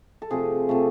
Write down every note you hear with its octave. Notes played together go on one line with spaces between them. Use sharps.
A4
C3 F3 A3 G#4
C3 F3 A3